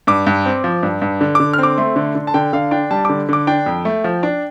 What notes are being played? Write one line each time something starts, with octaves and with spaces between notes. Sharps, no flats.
G2 D6
G2
C4
F3
G2
G2
D3
D3 D6
F6
C4 D6
A3 C6
D3
D3
A5
D3 G5
D3 F5
D4 G5
G3 A5
D3 D6
D3 D6
D4 G5
F2
A3
F3
D4